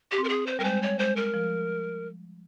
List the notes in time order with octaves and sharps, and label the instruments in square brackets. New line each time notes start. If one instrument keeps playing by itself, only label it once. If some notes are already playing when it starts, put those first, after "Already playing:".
[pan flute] G4
[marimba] C4
[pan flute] A#4
G#4
C5
[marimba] G3 [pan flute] A#4
[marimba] G#3 [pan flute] C5
[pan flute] C#5
[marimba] G#3 [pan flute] C5
[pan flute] A#4
[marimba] F3